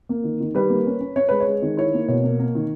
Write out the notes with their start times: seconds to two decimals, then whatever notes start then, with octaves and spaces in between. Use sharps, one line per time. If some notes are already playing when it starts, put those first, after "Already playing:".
0.09 A#3
0.24 D#3
0.40 D#3
0.55 G3 B4
0.70 A#3
0.86 C#4
1.01 C#4
1.16 C#4 C#5
1.29 G#3 B4
1.40 C#5
1.47 G#3
1.62 D#3
1.77 E4 C#5
1.94 A#3
2.08 B2 C#5
2.24 A#3
2.39 A#3
2.55 D#3